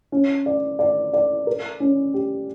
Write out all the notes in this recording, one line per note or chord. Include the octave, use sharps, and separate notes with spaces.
C#4
D5
D5
D5
A#4
C#4
G4